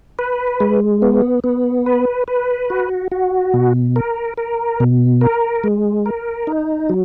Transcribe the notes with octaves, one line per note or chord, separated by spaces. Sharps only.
B4
G#3
B3
B3
B4
B4
F#4
F#4
B2
A#4
A#4
B2
A#4
G#3
A#4
D#4
F#3